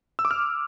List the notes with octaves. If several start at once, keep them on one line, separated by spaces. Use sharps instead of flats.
E6
D6
F6